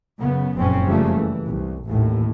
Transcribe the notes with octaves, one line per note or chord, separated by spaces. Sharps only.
F#2 C#3 B3
F#1 F2 A#2 C#3 C4 C#4
F2 C#3 F3 G3 A3 A#3
E3
C2
A1 D#2 A2